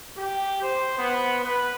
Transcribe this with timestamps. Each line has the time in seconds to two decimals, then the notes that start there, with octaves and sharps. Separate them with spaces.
0.17 G4
0.62 C5
0.98 B3
1.43 B4